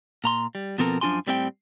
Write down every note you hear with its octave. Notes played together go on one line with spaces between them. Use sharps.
A#2 A#5 C6
G3
B2 F3 B3 C4 A4 A#4
F#2 F3 D4 F#4 G#5 C6
A2 G3 C4 C#5 G5